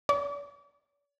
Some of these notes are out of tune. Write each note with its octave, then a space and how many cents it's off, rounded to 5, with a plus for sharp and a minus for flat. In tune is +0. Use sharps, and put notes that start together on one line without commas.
D5 -45